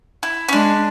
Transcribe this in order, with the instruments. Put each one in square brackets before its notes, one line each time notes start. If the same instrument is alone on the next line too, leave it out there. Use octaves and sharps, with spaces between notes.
[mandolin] E4
C#4
[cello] G#3 [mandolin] D4